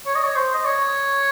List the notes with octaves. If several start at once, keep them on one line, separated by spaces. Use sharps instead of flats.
C#5
D#5
C#5
C5
D#5
C#5